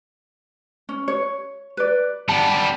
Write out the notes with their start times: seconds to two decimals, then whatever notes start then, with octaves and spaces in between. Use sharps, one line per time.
0.89 C#4
1.08 C#5
1.77 B4 D5
2.29 G3 B3 A5